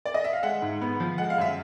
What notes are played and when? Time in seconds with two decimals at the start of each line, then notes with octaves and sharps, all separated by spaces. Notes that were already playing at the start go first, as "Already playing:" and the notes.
0.05 D5
0.14 D#5
0.24 E5
0.33 F5
0.43 G#3 E5 F#5
0.62 G#2
0.81 B3
1.00 F3
1.18 G#3 F#5
1.30 F5
1.38 F#2 E5